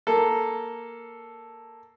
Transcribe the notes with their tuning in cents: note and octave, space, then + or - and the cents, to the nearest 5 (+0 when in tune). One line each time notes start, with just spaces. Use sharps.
A#3 +0 A4 +0